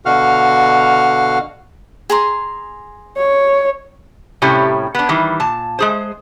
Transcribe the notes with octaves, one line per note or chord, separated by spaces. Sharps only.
B2 D3 F#4 F5 F#5 F6
G#4 A#5 C6
C#5
A2 C3 G3 C#4 G4
B3 D4
D#3 E3 G3
A#2 A5
G#3 G#4 C5